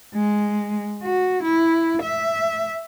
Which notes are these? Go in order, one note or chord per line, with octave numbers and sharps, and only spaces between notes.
G#3
F#4
E4
E5